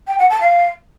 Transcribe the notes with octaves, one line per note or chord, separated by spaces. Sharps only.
G5
F#5
A5
F5